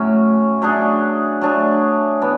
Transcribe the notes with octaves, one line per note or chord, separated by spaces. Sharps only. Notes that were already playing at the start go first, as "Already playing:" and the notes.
Already playing: A2 F#3 C#4
F#3 A3 D4 G#4
F#3 A3 D4 G#4
E3 B3 D4